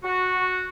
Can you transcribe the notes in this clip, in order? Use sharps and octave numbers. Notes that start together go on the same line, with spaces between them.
F#4